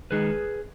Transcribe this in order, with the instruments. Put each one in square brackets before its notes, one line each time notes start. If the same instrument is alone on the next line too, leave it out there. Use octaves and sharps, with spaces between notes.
[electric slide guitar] D#3 G#3 D#4 G#4 B4